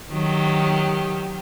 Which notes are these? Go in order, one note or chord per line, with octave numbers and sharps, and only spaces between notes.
D#3 F#3 G4